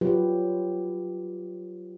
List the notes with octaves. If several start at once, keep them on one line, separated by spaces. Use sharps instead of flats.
F#3 F4 G4 B4